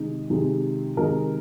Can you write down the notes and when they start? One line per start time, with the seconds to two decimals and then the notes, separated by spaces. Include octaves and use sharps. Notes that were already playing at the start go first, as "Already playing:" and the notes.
Already playing: C3 D#3 G#3 D#4
0.30 C3 D#3 G#3 D#4
0.97 C3 D#3 G#3 D#4 A#4